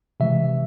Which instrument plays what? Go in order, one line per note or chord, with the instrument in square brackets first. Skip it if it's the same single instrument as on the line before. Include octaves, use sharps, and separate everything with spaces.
[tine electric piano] C3 E3 G#3 E5